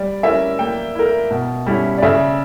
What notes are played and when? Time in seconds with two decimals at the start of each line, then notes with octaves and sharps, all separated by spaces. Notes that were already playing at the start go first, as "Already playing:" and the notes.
Already playing: G3 D5
0.23 C#4 E4 A#4 E5
0.59 A#3 G5
0.95 E4 A#4
1.31 B2
1.66 G3 C#4 E4
1.98 D5
2.02 C#3 E5